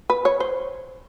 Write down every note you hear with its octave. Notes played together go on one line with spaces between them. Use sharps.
B4
C#5
C5